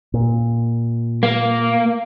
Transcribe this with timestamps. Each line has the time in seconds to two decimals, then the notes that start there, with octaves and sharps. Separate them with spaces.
0.14 A#2
1.23 A#3